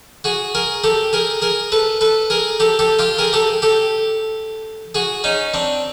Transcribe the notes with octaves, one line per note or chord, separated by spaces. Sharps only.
F#4 G#4
G#4 A#4
G4 A4
G#4 A#4
G#4 A#4
A4 B4
A4 B4
G#4 A#4
G4 A4
G4 A4
F4 G4
G#4 A#4
G4 A4
G4 A4
F#4 G#4
C#4 D#4
C4 D4